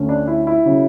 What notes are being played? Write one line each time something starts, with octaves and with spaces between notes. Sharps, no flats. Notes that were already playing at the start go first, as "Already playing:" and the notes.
Already playing: D2 D3 A3 C#4
D4
E4
E4
C#3 F#3 C#4